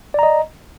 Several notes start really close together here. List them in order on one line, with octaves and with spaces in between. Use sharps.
D5 A#5 D#5